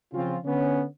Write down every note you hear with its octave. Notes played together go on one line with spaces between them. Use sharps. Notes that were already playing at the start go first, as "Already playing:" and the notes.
C#3 F3 C4 C#4 F4
D3 B3 C#4